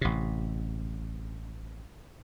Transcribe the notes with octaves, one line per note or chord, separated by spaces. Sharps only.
A1 C3